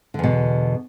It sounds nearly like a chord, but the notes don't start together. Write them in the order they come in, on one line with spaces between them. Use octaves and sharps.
D3 E2 B2